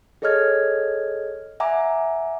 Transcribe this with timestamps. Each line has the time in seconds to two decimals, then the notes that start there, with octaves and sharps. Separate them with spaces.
0.22 G#4 A4 C#5 D#5 F6 G#6
1.60 E5 F#5 G#5 A#5 D6